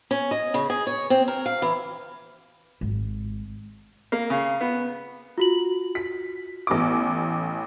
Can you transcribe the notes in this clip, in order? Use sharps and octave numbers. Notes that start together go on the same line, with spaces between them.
C#4
D#5
C#3
G#4
C#5
C4
A#4
F5
E3
G#1
A#3
C#3
B3
F4 F#4 F#7
B6
A1 B3 D6